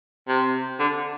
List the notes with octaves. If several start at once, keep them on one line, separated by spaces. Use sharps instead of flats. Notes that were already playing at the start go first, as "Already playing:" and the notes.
C3
D3